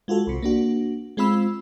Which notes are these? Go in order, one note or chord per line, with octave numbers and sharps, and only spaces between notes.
G#3 F4 F#4 A4
C2 C3
A#3 D4 F#4
G#3 C4 F4 B5 E6